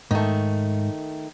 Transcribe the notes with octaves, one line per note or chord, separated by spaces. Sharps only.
G#2 D#3 A3